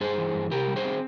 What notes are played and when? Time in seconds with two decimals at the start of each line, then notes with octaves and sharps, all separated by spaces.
0.01 G2 G#4 C5
0.18 E3
0.35 G2
0.51 C3 G4 A#4
0.68 G3
0.76 G#4 C5
0.85 C4